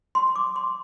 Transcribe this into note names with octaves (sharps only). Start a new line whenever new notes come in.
C6
D6
C6